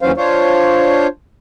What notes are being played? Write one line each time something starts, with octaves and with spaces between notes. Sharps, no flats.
D#2 E3 F#3 C#4 C5 F5
D4 F4 C5 C#5